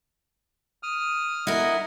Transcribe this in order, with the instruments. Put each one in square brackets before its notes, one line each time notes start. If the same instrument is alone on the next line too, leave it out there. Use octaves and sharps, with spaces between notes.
[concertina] D#6 F6
[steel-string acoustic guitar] E4 A#4 [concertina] D#5 F#5